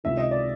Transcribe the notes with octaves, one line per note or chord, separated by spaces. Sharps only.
C#2 C3 D#3 E5
D#5
D5